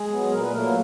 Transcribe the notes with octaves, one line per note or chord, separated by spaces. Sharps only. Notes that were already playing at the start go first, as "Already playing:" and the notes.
Already playing: G#3 G#4
F#3 B3
A#2 A#4
B4
F#3 A3 A#3 A#4